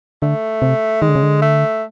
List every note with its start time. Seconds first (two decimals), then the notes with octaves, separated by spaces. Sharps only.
0.22 D3 A3
0.62 C3
1.02 D#3 G#3
1.09 D3
1.15 C#3
1.23 D3
1.42 A3